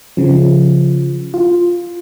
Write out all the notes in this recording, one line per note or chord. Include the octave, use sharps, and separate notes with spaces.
C#3 F3
F4